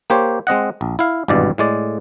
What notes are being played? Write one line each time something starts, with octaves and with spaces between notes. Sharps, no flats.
A#3 G4 C5 C#5
G#3 C4 D#5 F#5
A#1
E4 F5
G#1 E2 G2 B2 D5
A2 G#3 D5